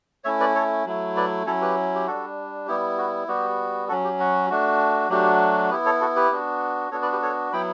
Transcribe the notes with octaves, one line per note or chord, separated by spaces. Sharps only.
A3 C#4 E4 C#5 E5
B4 D5
A4 C#5
F#3 A3 E4
B4 D5
F#3 C#4 E4 A4 C#5
G4 B4
G4
G3 D4 F#4 A4
G3 B3 E4 G4
F#4
G3 B3 F#4 G4
F#3 C#4 F#4 A4
G4
F#4
A3 D4 F#4
F#3 A3 D4 F#4 G4
B3 E4 G4 B4
A4 C#5
F#4 A4
G4 B4
B3 D4 F#4
B3 D4 F#4 A4 C#5
B4 D5
G4 B4
A4 C#5
F#3 B3 E4 G5 B5